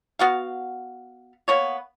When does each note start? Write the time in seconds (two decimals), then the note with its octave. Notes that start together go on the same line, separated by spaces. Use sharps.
0.19 B3 F#4 F5
1.48 A#3 B3 C#5